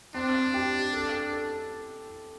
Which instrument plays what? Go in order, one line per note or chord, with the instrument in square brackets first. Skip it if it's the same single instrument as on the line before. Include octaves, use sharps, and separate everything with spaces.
[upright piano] C4 [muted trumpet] D4
[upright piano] G4
A4
A4